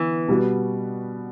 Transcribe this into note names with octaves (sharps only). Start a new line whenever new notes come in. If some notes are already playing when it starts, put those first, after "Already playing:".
Already playing: D3 E3 B3
B2 G3 B3 F#4